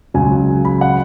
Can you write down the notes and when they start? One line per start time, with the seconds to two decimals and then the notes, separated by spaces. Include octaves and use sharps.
0.14 C#2 C#3 F#3 G#5
0.65 B5
0.81 F#5